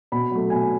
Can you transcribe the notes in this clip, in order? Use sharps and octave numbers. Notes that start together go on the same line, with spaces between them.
B2 B5
F#3 A3
B2 G#5